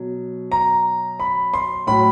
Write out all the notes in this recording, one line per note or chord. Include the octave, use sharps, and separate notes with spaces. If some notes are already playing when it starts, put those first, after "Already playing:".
Already playing: B2 F#3
A#5
B5
C6
A2 F#3 B5